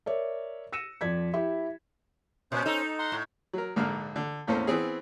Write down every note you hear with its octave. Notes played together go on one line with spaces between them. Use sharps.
A#4 C#5 D5 E5
E6 A#6 C#7 D#7 E7
F2 F3 D5 G#6 B6
E4 G4
A#2 C#4 C5
D#4 A4
F#5 A#5 C6
A2
F#3 A#4
A#1 G#2 D3 A#3 F5 F6
D3
E2 A2 A#3 C#4 A4 C5
E3 B3 C4 G#4